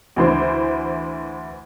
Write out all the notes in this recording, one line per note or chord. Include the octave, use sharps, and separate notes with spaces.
D2 E3 C5